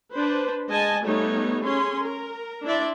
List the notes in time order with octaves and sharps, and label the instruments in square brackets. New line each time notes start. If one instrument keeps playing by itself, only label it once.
[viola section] D4 B4 C5
G#3 D#5 G#5 A5
G3 A3 B3 D#4 C#5
C#4 G#4 C6
A#4
D4 E4 D5 E5 C6